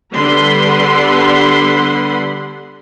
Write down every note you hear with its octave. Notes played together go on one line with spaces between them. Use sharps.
D3 G3 B3 F#5 B5 C6